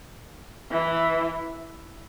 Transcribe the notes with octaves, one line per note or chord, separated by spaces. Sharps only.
E3